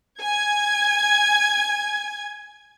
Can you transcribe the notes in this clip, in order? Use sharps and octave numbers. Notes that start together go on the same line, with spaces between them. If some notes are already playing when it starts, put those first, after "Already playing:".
G#5 G#6